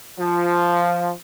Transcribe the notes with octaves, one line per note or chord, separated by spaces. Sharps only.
F3 F4